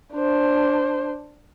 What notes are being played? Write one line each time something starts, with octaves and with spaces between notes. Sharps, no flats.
D4 C5